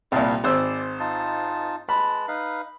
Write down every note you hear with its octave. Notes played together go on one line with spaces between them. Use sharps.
C2 A#2 E4 F5 A5
G#1 C5 D5 E6
D#4 F4 A5
G#3 B4 A5 B5
D#4 B4 F5